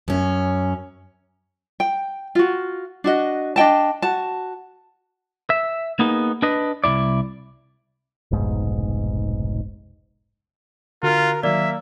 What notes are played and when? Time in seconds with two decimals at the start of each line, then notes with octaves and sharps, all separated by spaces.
0.08 F#2 C#4
1.80 G5
2.35 F4 F#4
3.04 D4 F#4 D#5
3.56 D4 D#5 G5 A5
4.02 F#4 A5
5.50 E5
5.99 A#3 B3 D#4 G#4
6.42 D4 B4 D#5
6.84 C2 F2 E4 D5
8.31 F1 B1 G#2
11.03 D3 F4 F#4 A#4 F#6
11.43 D#3 F#3 A#3 D5 E5